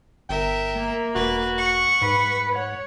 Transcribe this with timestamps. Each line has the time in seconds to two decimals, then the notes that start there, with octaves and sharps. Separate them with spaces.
0.29 G1 A#4 E5 G5
0.76 A#3
1.15 E1 F#4 B4
1.57 F#5 C#6
2.02 G#2 B4 B5
2.56 C#5 F#5